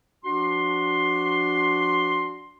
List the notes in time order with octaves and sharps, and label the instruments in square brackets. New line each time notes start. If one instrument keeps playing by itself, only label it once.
[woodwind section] F3 D4 F#4 C6